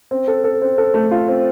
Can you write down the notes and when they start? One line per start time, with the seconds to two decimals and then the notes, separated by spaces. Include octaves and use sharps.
0.11 C4
0.28 A4
0.44 A4
0.62 C4
0.78 A4
0.94 A3
1.11 F4
1.28 C4